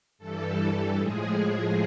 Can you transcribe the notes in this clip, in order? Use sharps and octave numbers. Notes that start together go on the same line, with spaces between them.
G2 E3 G3 A4
A2 F3 G#3 G#4